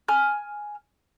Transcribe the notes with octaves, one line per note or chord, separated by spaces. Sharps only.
G#5 F6